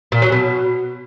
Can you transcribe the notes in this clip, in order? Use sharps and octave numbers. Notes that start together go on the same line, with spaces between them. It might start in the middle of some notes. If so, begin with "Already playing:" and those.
A#2
F#3
B2